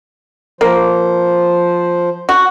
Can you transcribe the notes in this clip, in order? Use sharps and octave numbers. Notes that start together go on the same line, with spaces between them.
F3 A#3 C5
F#4